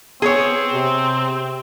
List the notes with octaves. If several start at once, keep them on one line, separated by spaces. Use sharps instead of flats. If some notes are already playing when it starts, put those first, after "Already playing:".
B3 C4 G#4 C#5
C3